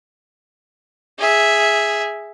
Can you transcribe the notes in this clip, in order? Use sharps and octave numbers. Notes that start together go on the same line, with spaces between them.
G#4 E5